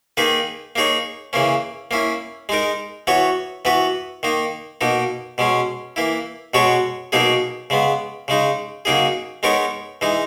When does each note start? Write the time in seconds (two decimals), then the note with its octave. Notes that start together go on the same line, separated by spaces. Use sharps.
0.17 D#3 A#3 D#4 G#4 B4
0.76 A#3 D#4 G#4 C#5
1.33 C#3 E3 A#3 C#4
1.91 A#3 C#4 E4
2.49 G#3 D#4 A#4
3.07 E3 B3 F#4 C#5
3.65 E3 B3 F#4 B4
4.23 D#3 A#3 D#4
4.81 B2 A#3 D#4
5.38 B2 G#3 C#4
5.96 E3 A#3 E4
6.54 B2 G#3 B3 F#4 C#5
7.12 B2 F#3 A#3 D#4 G#4
7.70 C#3 G#3 B3
8.28 C#3 G#3 D#4
8.85 C#3 F#3 A#3 D#4 G#4
9.43 G#3 B3 D#4 A#4 C#5
10.01 E3 G#3 D#4